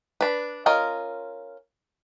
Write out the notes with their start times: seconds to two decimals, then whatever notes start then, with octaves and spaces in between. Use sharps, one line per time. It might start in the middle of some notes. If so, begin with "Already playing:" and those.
0.21 D4 B4
0.66 C#4 F4 A#4 D#5